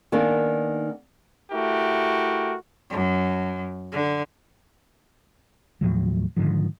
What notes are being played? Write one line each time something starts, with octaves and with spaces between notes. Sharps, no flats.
D#3 A#3 B3 D4 G#4
A3 E4 F#4 G4 A#4
F#2
D3
D#2 A2 F3 F#3
G#2 D3 D#3 F3